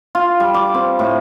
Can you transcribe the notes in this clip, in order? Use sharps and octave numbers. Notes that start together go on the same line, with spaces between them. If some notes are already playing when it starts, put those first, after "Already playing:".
F4
G3
D6
C4
A2